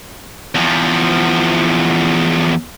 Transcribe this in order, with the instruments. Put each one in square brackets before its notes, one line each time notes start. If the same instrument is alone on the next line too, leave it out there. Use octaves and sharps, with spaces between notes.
[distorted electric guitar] E2 F3